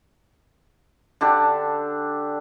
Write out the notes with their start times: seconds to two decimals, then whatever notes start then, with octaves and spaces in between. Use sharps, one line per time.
1.21 D3 D4 G4 A4